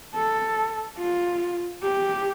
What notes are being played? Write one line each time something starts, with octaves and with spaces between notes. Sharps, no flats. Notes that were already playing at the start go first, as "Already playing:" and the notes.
A4
F4
G4